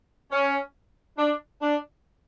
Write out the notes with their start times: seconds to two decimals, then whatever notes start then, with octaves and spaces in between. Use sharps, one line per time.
0.30 C#4
1.18 D4
1.61 D4